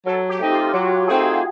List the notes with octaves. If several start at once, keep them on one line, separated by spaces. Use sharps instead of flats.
F#3 A4
G4
A3 C4 D#4
F4
F#3 F#4
A3 C4 D#4 G#4
G#4